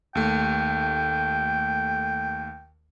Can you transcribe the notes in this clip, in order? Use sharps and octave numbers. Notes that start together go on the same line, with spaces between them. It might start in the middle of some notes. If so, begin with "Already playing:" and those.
D#2 A3 G5